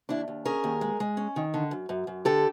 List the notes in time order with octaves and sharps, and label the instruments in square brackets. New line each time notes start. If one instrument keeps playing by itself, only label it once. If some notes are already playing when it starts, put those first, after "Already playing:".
[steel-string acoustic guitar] D#2 D4 E4
D#2
C#4 G#4 A#4
D#2
G#3
G#3
C#4
D#3
D3
F#2
F#2
F#2
D3 G4 A4